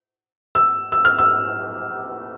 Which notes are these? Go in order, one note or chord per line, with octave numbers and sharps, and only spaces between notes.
E6
E6
F6
E6